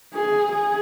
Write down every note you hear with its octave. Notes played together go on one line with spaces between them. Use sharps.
G#4
G#4